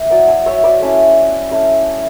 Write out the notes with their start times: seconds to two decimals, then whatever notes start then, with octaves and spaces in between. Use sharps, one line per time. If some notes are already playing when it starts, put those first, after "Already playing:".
Already playing: E5
0.10 F#3 B3 E4 D5 F#5
0.28 E5 G#5
0.46 C#5 E5
0.64 B4 D5
0.81 A3 C#4 E4
1.51 A3 C#4 E4